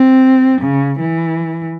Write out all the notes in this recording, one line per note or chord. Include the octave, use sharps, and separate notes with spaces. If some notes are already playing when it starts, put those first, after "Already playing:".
Already playing: C4
C#3
E3